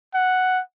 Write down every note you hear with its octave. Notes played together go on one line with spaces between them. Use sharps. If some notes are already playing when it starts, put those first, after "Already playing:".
F#5